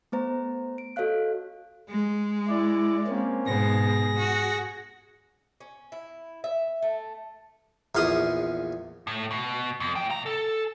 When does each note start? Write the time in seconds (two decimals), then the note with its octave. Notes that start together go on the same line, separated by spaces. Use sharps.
0.12 A3 B3 C5 A#5
0.78 D7
0.96 F#4 A4 C#5 D#5 F5 F#6
1.89 G#3
2.49 E4 D5
3.07 A#3 C4 C#4
3.46 G#2 B2 G#4 A#6
4.18 F#4
5.60 C#4
5.92 E4
6.44 E5
6.82 A3
7.95 A#1 E2 F5 C6 D#6
9.07 A2
9.31 B2
9.80 F2
9.95 A2 G5
10.10 B2 A#5
10.26 A4